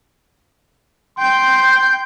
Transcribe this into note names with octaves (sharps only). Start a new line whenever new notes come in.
G5 C6 G6